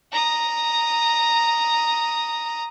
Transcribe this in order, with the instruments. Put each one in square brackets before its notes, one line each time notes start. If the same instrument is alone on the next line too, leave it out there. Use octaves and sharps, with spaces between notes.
[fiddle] A#5 D#6